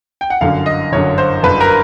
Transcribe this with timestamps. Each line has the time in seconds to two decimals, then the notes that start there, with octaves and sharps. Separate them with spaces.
0.21 G5
0.30 F#5
0.41 G1 F#2 D3 F5
0.66 D#5
0.92 G1 F#2 D3 C#5
1.18 C5
1.43 G1 F#2 D3 B4
1.60 A#4